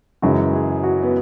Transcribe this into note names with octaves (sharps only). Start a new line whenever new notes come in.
F#2 C#3 E3 G#3 F#4
G#4
F#4
B3